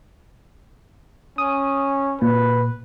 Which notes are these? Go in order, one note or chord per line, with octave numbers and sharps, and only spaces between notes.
C#4 D#6
A#2 B4